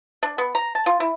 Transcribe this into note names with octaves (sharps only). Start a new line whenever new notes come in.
D4
B3
A#5
A5
F4
E4